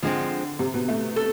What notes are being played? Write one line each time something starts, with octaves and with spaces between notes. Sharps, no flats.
D3 F3 G#3 C4
C3
B2
A3
A4